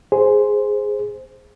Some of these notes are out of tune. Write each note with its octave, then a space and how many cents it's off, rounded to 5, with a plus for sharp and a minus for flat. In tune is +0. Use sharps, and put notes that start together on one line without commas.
G#4 +0 C5 +0